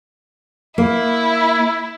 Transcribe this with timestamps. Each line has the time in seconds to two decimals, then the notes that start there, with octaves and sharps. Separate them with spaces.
0.78 A#3 E4